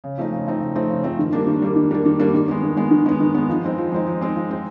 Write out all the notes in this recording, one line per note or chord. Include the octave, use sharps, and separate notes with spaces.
C#3
F3 A3 C4 D#4
C#3
F3 A3 C4 D#4
C#3
F3 A3 C4 D#4
C#3
F3 A3 C4 D#4
D#3
G3 A#3 D4
D#3
G3 A#3 D4
D#3
G3 A#3 D4
D#3
G3 A#3 D4
D#3
G#3 B3
D#3
G#3 B3
D#3
G#3 B3
D#3
G#3 B3
F3
G#3 C4 D#4
F3
G#3 C4 D#4
F3
G#3 C4 D#4
F3
G#3 C4 D#4